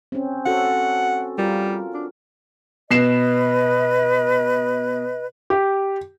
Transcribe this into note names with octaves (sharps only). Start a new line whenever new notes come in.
C4 C#4
C#4 F#4 A4 F#5
G3 F4 A#4
D4
B2 B4 D#5 C7 E7
G4